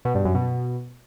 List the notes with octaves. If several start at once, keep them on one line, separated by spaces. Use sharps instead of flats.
B2
G2
F#2
B2